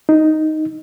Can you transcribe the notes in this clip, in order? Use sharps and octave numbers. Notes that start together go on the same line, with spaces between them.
D#4